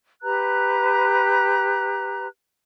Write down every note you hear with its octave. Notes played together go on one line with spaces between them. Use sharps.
G4 B4 A#5 F#6